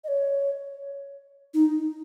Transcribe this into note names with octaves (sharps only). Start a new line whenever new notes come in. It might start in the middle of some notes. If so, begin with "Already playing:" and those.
D#5
C#5
D#4